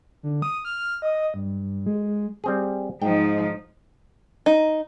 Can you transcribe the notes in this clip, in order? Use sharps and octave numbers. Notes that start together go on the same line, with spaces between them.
D3
D#6
F6
D#5
G2
G#3
G3 C4 G#4
G#2 F3 D#4 G5
D#4